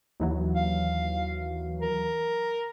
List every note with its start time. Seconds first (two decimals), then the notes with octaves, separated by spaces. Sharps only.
0.20 D#2 E3 F#3
0.55 F5
1.81 A#4